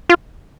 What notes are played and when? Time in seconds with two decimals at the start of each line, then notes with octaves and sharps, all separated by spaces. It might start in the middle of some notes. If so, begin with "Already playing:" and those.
0.09 F4